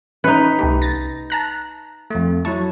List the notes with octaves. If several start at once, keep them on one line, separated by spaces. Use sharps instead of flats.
E3 C#4 D#4 B4 C#6
C2 A3 G4
A6 A#6
A5 A#5 F#6
F2 A3
F#3 E4 A5 C#6